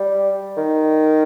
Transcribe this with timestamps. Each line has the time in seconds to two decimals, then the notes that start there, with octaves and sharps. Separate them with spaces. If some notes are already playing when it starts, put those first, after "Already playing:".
Already playing: G3
0.57 D#3